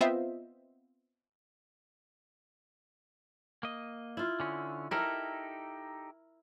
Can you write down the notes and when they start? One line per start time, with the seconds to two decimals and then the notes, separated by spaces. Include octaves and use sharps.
0.01 B3 C4 F4 C5 D#5 E5
3.63 A#3 D#5
4.17 E4 F4
4.40 D3 C#4
4.91 D#4 E4 G4 A4 A#4